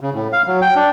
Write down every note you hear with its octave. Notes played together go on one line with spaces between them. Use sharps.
C#3
A2
F5
F#3
G5
D4